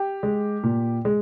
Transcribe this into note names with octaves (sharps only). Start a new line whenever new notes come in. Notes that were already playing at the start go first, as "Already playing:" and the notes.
Already playing: G4
G#3
A#2
G#3